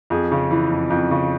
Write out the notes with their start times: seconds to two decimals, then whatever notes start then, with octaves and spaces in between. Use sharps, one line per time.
0.10 F2 G#4
0.32 C#3
0.51 E3
0.71 F2
0.90 F2
1.11 C#3